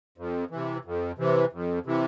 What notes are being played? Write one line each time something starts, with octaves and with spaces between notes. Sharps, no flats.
F2
C3 E3
F2
C3 E3
F2
C3 E3